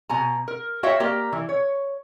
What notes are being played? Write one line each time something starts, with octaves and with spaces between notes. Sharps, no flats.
B2 G#5 A#5
A#4
F#4 C#5 E5 F5 G5
A#3 G4 A#4 D5
E3
C#5